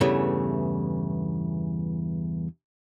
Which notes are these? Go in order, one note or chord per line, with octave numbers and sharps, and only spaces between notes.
E2 G2 C#3 E3 A3